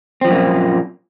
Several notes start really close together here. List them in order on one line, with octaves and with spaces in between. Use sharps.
C4 F3 F#2 A#3 A#2